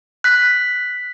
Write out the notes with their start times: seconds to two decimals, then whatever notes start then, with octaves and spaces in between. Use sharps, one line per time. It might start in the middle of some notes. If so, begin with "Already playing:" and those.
0.24 F#6 B6